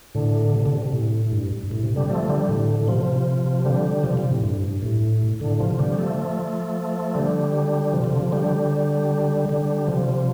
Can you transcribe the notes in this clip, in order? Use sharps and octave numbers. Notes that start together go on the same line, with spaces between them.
A2 D3
C3
D3
C3
A2
G2
G2
A2
C3
D3 G3
F3 A3
D3 G3
A2 D3
D3
C3 F3
D3 G3
C3 F3
C3
A2
G2
A2
A2 D3
C3 F3
D3 G3
F3 A3
F3 A3
D3 G3
C3 F3
C3
D3
F3
D3 G3
D3 G3
C3 F3